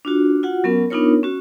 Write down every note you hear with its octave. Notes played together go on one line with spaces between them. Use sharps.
D4 F4 F#4
F4 F#4 F#5
F#3 B3 C#4 A#4
B3 D4 D#4 F4 A#4 C#5
C#4 F#4